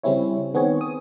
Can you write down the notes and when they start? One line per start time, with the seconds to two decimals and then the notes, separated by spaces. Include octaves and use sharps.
0.03 C#3 G3 C4 C#4 E4 C#5
0.54 D#3 B3 C4 G#4 C#5
0.81 D#6